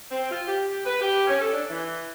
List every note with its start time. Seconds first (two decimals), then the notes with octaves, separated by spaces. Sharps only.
0.11 C4
0.31 F4
0.47 G4
0.85 B4
1.01 G4
1.27 C#4
1.41 A4
1.53 D4
1.70 E3